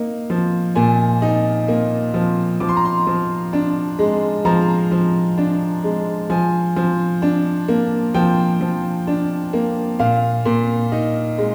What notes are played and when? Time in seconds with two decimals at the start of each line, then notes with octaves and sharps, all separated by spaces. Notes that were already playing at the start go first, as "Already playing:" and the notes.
Already playing: A#3 D#4
0.30 F3
0.75 A#2 G#5
1.22 D#4
1.68 A#3
2.14 F3
2.60 F3 D6
2.69 C6
2.76 A#5
2.85 C6
3.07 F3
3.53 D4
3.99 G#3
4.45 F3 A#5
4.91 F3
5.37 D4
5.84 G#3
6.30 F3 G#5
6.76 F3
7.22 D4
7.68 A#3
8.14 F3 G5
8.61 F3
9.07 D4
9.53 A#3
9.99 A#2 F5
10.45 A#2
10.92 D#4
11.38 G#3